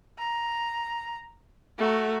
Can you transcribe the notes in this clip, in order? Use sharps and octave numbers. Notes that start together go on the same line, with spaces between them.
A#5
A3 F#4 A#5